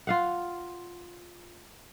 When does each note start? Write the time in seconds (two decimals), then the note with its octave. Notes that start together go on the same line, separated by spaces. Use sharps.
0.07 F4 F5 F#5